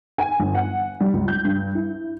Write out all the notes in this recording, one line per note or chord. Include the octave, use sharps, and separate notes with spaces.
G#5
G1
F#5
G3
C#2
G6
G2
E4